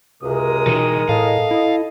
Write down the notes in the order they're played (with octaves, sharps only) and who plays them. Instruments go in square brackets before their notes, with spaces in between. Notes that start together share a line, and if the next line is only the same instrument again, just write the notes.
[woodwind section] C#2 F#2 C3 [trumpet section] G#3 A#4 D#6
[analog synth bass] B2 [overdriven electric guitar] E3 D#4
[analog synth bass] A2 [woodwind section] A4 D#5 [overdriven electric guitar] F5
[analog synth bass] E4